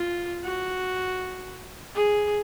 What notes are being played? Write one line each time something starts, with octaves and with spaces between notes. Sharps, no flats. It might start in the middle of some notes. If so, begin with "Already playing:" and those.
Already playing: F4
F#4
G#4